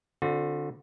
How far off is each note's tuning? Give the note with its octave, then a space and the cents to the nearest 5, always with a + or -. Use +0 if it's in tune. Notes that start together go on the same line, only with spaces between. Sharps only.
D3 +0 C4 +0 F#4 -40